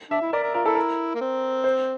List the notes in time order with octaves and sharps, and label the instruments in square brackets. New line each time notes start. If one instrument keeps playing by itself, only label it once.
[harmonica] D4 [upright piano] E5
[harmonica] E4
[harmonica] A#4 [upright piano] D5
[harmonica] A#4
[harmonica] F4 [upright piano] A#4
[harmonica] E4 [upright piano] A4
[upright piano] A#4
[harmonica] A#3
C4
[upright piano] C5